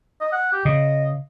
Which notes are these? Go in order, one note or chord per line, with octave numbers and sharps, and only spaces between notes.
D#5
F#5
G4
C#3 D#5